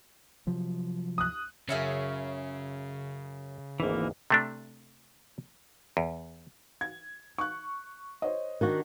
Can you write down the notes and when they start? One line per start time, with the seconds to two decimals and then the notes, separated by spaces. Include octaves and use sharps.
0.47 C3 F3 F#3
1.18 D#6 F#6
1.69 F#2 C#3 C#4 G#4 C#5 E5 C#6
3.80 G#1 D2 G#2 E3 A#3
4.30 C3 A3 D4
5.97 E2
6.81 G#6
7.38 C#6 F#6
8.22 C5 C#5 D#5
8.61 D#3 D4 F#4